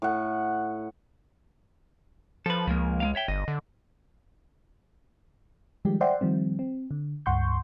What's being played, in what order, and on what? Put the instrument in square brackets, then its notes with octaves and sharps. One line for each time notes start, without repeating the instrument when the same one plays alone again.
[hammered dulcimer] A2 F#5
[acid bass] F3 [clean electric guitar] A4 B4
[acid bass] C#2 [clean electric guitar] F3 G#3 A#3
[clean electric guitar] G#3 A#3 F5
C#5 E5 G5
[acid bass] G1 [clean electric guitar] D#5
[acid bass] D3
[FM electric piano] D#3 F3 G3 G#3 G4
C5 D5 E5 F#5 G5 C6
D#3 F3 G3 C4
C4
D3
C#2 G2 F#5 C6 C#6 G6